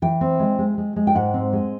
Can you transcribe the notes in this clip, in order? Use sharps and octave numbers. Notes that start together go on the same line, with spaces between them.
E3 G5
C4
G#3
G#3
G#3
G#3
G5
G#2 F#5
C4
G#3